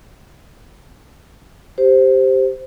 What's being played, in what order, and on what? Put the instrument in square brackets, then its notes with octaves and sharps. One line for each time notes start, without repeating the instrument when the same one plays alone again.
[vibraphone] G4 C5